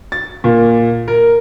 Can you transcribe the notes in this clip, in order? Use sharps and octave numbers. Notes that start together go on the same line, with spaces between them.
A6
A#2
A#4